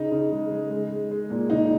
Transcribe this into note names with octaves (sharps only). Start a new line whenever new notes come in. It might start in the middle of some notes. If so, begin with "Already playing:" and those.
Already playing: C#3 D#4
C#3
G#3
G#3
G#3
G#3
G#3
A#2
C#3 D#4